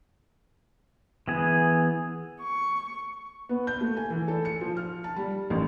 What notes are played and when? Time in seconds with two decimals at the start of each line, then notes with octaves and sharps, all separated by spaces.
1.28 E3 B3 G#4
2.41 C#6
3.49 B3
3.67 G6
3.81 A3
3.97 G#5
4.10 E3
4.28 A4
4.45 C#7
4.61 F3
4.77 F6
5.04 A5
5.16 G3
5.50 A1